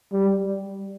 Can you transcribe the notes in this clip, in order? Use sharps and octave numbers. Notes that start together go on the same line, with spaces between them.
G3